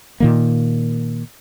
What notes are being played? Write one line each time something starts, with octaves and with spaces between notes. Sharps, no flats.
A#2 D#3 A#3